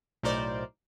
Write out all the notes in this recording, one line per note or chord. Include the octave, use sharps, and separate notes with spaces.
B1 A2 D#4 A#4 C5 D5